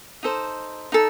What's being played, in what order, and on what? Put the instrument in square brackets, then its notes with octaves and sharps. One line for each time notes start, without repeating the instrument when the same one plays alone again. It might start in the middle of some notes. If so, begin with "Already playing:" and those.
[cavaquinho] D#4 A4 C5
D#4 A4